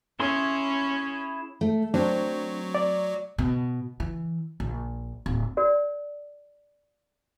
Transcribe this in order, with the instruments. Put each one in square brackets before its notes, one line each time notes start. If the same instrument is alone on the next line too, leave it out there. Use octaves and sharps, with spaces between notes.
[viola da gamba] C#4 [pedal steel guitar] E4 G#4 C6
[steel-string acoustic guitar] A3
[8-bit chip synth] F#3 [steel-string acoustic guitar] C4 [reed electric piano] D4
[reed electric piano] D5
[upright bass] B2
E3
A#1
D1
[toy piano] F#4 A#4 D5